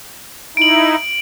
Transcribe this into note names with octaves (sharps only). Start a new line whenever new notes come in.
D#4 E4 D7 F#7